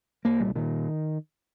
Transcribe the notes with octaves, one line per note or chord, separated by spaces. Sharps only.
C2 A#3
A#2 G3
A#2 D#3